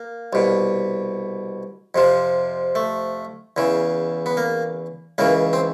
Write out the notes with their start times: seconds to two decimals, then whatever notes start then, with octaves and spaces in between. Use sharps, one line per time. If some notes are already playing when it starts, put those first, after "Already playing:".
Already playing: A#3
0.33 C2 B2
1.95 F2 C3 F3
2.75 A3
3.57 E2 C#3 E3
4.26 B3
4.37 A#3
5.18 C#2 C#3 E3 A#3
5.53 C4